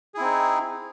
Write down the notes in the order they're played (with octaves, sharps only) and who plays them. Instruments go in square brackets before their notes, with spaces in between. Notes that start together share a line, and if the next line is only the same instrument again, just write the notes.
[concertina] G#4
E4
C4
D#4